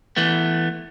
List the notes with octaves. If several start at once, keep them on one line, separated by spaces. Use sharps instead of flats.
E3 A3 B3